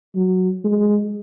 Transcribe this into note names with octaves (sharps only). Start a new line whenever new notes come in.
F#3
G#3